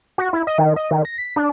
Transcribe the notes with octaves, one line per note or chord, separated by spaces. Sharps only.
F#4
E4
D#5
D#3
D#5
D#3
A#6
B6
D4